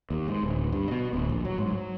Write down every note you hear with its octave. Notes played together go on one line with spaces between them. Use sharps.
D#2
G#2
D1
G2
B2
D1
A#1
F#3
G#2
F#3